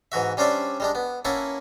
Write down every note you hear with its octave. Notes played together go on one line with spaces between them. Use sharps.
G#2 E3 F#4 E5
G3 C#4 D4 C5 D5 E5
G3 G#3 D4
B3
A#3 C#4 E4 E5 F#5 A5